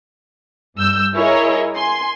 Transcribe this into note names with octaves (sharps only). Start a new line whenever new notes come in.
G2 E6 G6
E4 G#4 A#4 C#5 D#5
G#5 C6